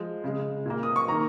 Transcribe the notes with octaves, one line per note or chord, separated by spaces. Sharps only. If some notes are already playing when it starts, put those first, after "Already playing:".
Already playing: F3 G#3
C#3 G#3
A#2 A#3
D#6
C#6
D#3 A#3 A#5